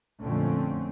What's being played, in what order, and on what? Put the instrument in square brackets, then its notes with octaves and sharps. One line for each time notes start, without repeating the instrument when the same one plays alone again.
[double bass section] F2 A#2 D3 A3 C4 C#4